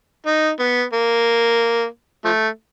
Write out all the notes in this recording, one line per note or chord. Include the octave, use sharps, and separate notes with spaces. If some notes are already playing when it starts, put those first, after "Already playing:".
D#4
B3
A#3
F3 A3